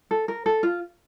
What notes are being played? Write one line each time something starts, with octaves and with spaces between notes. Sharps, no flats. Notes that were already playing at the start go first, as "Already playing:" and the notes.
A4
A#4
A4
F4